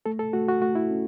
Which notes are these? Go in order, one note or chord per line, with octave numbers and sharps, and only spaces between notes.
A3 A4
A4
A3 F#4
F#4
A3 F#4
E4
C#4